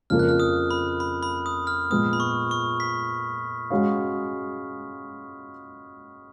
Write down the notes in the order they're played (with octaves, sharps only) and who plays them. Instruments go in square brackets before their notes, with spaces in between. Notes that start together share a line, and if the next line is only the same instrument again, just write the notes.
[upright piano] F2 C#3 F3 A#3 [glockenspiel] F6
[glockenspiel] F#6
F6
D#6
B5
B5
B5
D#6
F6
[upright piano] A#2 F3 G#3 B3 [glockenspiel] D#6
[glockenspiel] B5
C#6
C#6
B6
[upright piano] G#3 C#4 F#4 C#5 F5